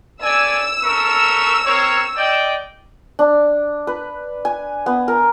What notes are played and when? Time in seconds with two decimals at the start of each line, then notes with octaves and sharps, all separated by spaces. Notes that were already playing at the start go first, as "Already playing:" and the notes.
0.23 A3 D5 G#5 E6
0.83 A3 A#4 C#6
1.66 C4 A#4 C#5
2.17 D5 D#5 G5
3.19 D4
3.87 B4
4.45 G#5
4.86 B3
5.08 A#4